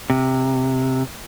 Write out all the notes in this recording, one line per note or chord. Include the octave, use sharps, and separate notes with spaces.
C3